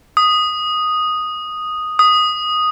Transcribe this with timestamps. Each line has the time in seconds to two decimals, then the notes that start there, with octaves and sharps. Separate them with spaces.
0.17 D#6
1.99 D#6